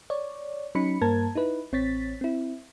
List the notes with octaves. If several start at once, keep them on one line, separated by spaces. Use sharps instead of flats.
C#5 D5
F#3 C#4 D#4 B5 C#7
G2 A#3 A#4 C5 A5 G#6
D#4 E4 B4
A1 C4 C#5 A6 B6
C4 E4